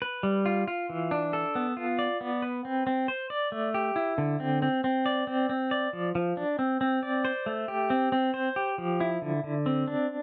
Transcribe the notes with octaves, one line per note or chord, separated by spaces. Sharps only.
B4
G3
F4
F4
E3
D4
A4
B3
F4
D5
B3
B4
C4
C4
C5
D5
A3
G4
E4
D3
C4
C4
C4
D5
C4
C4
D5
F3
F3
D4
C4
C4
D5
C5
A3
G4
C4
C4
C5
G4
F3
E4
D3
D3
C4
D4